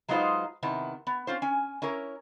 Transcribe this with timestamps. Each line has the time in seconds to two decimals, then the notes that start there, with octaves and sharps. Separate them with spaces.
0.09 F#3 G#3 D#4 F4 B4 C5
0.63 C3 D#3 B3 E4
1.07 B3
1.27 C4 C#4 F4 C5
1.42 C#4 G#5
1.82 C#4 E4 A#4 C#5